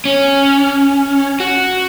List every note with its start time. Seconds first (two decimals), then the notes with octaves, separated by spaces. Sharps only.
0.05 C#4
1.40 F#4